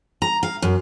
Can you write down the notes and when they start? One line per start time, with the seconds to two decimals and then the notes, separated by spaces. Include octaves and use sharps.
0.22 A#5
0.43 F5
0.62 F#2